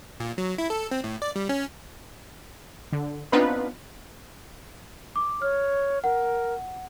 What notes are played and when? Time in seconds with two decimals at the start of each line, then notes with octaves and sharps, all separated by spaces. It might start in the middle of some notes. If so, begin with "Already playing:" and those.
0.20 A#2
0.38 F#3
0.58 E4
0.70 A4
0.91 C4
1.04 A2
1.22 D5
1.36 G3
1.49 C#4
2.92 D3
3.32 B3 C4 D4 D#4 F4 B4
5.16 D6
5.42 C#5 F6
6.04 A#4 F#5